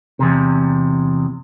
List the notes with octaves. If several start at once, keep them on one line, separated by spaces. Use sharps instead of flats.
E2 C3